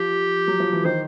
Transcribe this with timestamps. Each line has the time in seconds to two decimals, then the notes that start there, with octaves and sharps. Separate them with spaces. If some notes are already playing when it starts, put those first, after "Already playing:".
Already playing: F3 G4
0.48 F#3
0.60 F3
0.73 E3
0.85 D#3 C5